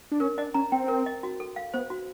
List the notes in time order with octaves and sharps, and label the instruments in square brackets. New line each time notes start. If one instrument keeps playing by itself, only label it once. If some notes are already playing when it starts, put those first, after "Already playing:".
[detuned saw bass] D4
[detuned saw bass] C#4 [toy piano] A#4
[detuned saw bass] D4 [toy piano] D#5
[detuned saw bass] C#4 [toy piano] A#5
[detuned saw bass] C4 [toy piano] G5
[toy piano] A#4
D#5
F#4
A4
F5
[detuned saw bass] B3 [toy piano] C5
[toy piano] F#4